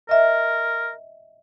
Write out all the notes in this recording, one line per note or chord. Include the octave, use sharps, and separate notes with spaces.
A#4 D#5 E5